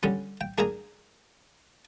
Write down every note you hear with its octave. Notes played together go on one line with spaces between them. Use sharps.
D3 G3 C#4
G5
D4 G#4 A#4 D5 G#5 A#5